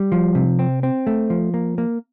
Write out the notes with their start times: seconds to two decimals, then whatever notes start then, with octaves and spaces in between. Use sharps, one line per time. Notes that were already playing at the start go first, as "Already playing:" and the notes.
Already playing: G3
0.12 F3
0.35 C3
0.59 C4
0.83 C4
1.07 A3
1.30 F3
1.54 A#3
1.78 A#3